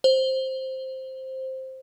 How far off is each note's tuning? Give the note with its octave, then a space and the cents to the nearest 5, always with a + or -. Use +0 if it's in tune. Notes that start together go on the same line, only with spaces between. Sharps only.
C5 +5